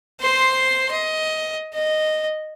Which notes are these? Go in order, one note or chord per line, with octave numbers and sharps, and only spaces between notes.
C5 C6
D#5
D#5